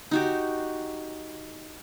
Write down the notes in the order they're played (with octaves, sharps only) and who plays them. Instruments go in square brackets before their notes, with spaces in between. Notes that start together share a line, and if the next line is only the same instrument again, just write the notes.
[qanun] D#4 F#4 G4